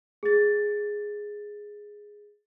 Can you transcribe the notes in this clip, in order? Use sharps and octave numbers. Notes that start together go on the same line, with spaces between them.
G#4 A6